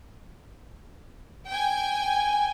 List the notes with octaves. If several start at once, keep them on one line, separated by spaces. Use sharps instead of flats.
G5 G#5